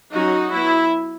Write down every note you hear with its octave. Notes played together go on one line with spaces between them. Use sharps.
F#3 C#4 D#4 F#4
F#3 B3 E4